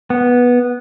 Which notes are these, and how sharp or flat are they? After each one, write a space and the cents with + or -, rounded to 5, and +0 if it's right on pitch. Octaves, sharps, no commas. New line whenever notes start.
B3 -10